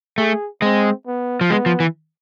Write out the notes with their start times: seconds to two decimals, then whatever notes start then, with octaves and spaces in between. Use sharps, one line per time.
0.18 A3 G#4
0.62 G#3 C4
1.07 B3
1.41 F3
1.50 G#3 B3
1.66 F3
1.80 E3